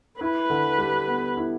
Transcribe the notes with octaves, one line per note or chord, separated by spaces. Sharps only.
E4 B4
D3
G3
B3
E4